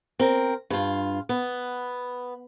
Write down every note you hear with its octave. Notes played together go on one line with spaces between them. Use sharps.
C4 A#4
G2 F4
B3